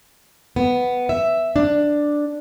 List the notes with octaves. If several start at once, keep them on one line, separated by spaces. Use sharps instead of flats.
B3
E5
D4